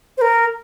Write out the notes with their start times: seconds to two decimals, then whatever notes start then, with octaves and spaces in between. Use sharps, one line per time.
0.18 C5
0.22 A#4